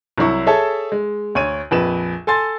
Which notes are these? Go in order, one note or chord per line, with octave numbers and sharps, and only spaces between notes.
C2 F#3 E4 C#6
G#4 A4 C#5 E5 A5
G#3
D2 C#5 D#7
A#1 F2 B4 E7
A4 G#5 C6 A6